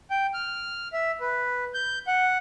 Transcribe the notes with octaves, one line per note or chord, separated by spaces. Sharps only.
G5
F6
E5
B4
G6
F#5